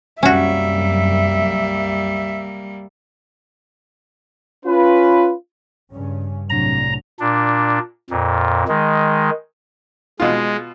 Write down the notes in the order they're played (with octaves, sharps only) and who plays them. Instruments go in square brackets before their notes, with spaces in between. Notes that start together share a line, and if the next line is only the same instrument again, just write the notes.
[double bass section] C2 F#2 [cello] G3 A#3 [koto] C#4 F#4 [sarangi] E5
[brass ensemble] C#4 F4 B4
[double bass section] G2 C#3 C#4
[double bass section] C2 F#3 [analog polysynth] A2 C3 D4 [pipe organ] A#5
[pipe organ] A#2 D4
F2 A#2
D#3 G#3
[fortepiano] B2 F4 [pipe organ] G#3